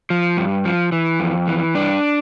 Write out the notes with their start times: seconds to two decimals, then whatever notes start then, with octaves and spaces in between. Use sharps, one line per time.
0.10 F3
0.37 G2
0.65 F3
0.92 E3
1.20 F2
1.47 E3
1.75 G2 D4